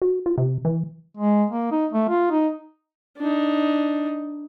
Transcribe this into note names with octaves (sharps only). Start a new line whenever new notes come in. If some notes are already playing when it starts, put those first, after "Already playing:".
F#4
F4
C3
E3
G#3
A#3
D#4
A3
F4
D#4
D4 D#4